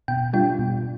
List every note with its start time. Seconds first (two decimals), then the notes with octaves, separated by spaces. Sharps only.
0.08 B2 G5
0.33 G3 D4 F4 G5
0.59 B2